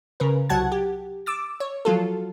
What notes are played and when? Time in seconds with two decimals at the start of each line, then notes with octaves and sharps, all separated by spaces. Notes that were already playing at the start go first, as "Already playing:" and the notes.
0.20 C#3 A#4 B4
0.49 C2 F#3 F#5 A5 G#6
0.72 G4
1.26 D6 E6 A6
1.60 C#5
1.85 F3 F#3 F4 A4